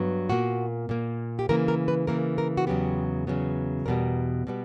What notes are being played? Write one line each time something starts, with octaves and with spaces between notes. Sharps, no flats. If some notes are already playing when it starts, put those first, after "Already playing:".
Already playing: G2 F#3 B3
A#2 A#3 F#4
A#2 A#3
G4
C#3 E3 A#3 A#4
A#4
B4
C#3 E3 A#3 A#4
A#4
F#4
E2 C#3 F#3 B3 G4
E2 C#3 F#3 B3
E2 B2 G3 B3 A#4
B2 G3 B3